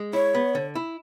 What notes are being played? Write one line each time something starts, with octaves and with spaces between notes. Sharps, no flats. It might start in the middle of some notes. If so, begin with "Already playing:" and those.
Already playing: G#3
E4 C#5
B3
D3
E4